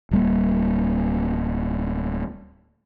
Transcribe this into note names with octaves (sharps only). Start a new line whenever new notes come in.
D1 G3 A#3